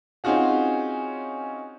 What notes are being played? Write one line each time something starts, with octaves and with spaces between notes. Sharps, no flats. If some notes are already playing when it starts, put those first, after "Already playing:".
C4 C#4 D#4 F4 F#4 G#4